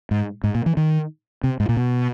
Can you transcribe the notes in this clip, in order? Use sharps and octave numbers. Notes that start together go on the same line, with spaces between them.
G#2
G#2
A#2
E3
D#3
C3
G#2
A#2
B2